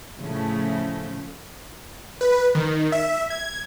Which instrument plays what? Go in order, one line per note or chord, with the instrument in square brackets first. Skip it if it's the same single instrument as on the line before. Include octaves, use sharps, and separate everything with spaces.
[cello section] A2 C#3 F3 A3
[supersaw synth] B4
D#3
E5
G#6